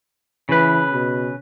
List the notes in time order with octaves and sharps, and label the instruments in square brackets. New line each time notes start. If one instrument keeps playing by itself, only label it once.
[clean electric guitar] C#3 B4 [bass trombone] E3
[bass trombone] B2